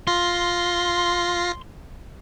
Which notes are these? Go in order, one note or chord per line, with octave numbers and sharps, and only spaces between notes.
F4 C6 A#6 C7